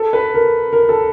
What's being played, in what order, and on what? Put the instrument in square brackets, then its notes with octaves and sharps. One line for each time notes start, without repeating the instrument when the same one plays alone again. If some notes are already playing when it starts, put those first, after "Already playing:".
Already playing: [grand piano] A4
B4
A#4
A#4
A4